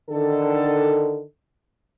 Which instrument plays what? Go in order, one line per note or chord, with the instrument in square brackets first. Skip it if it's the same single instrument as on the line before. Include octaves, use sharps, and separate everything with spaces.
[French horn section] D3 D#3 A4